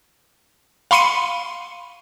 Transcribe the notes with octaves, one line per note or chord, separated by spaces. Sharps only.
F5 B5 C6 C#7 D#7